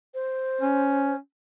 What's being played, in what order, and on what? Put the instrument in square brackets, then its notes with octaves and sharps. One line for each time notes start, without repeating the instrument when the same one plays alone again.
[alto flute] C5
[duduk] C#4